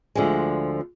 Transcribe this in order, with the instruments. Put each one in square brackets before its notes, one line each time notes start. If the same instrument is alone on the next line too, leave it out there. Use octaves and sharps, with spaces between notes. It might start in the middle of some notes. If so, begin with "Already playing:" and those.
[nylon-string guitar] D2 D3 F3 G#3